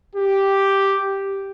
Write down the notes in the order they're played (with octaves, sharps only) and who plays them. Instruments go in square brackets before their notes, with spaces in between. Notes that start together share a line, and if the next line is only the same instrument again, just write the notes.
[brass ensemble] G4